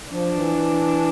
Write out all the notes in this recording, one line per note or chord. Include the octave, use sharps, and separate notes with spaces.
F3 D4
E3